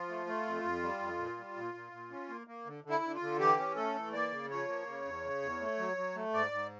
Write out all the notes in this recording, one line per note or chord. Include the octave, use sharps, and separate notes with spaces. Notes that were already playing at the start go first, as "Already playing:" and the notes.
Already playing: F3 F4
A3
A3
F2
F2
G3
F2
A#2
G3
A#2
A#2
A#2
C#4
A#3
A#3
D3
D3
E4
D3
F4
D3
E3 G4
C#4
A3 A4
E3
A#3 D5
C#3
F3 C#5
A#3
C#3
E2
C#3
E2
A3
F#3
F#3
A3
G#2 D5
G#2